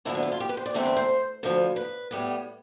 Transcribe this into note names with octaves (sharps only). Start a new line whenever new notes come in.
D2 D3 F3 B3 E4
D4
E4
F4
G4
B4
C5
D5
E2 D3 A3 C4
B4
C5
D2 D3 F3
B4
A2 G3 B3